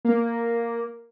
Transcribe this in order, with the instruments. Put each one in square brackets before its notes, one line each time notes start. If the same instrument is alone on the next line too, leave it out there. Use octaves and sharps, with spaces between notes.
[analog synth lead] A#3